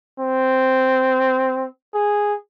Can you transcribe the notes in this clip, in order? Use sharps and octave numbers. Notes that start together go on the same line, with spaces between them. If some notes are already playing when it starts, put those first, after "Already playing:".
C4
G#4